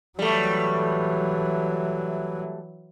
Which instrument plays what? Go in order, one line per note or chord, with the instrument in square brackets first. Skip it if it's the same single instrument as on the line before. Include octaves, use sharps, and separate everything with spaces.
[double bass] E3 F#3 [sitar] G3 A3